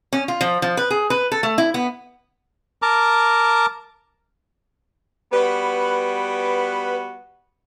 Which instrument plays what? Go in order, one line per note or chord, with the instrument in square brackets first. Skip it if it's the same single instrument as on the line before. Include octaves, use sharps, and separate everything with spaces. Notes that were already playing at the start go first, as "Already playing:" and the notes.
[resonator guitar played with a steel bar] C#4
F4
F3
F3
B4
G#4
B4
A4
A3
E4
B3
[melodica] A#4 A5 A#5 D6
[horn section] G3 B3 F#4 [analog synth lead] B4